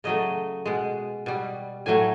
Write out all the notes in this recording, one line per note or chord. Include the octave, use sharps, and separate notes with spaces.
C#3 F#3 A3 D#5
B2 G#3
B2 G3
A2 F#3 A3 G#5